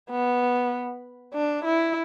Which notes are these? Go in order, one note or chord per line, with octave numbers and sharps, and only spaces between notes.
B3
D4
E4